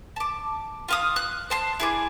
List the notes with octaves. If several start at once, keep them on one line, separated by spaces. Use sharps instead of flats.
A5 D6
F4 F5 D#6
F#6
C5 A5 C6
E4 G#4 D5